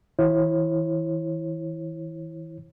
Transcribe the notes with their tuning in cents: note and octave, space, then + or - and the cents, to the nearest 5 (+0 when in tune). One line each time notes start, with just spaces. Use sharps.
E3 -45 E4 +0 C#5 -40